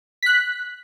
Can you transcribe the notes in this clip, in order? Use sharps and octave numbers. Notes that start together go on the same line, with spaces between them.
F#6 B6